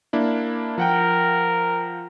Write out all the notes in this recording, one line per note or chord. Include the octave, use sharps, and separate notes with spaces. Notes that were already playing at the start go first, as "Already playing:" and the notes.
A#3 D4 E4
F3 A#4 F#5 G5